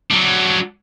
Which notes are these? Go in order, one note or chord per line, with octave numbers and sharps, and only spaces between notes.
F#3 D4